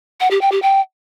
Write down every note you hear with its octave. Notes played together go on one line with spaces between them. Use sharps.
F#5
G4
G5
G4
G5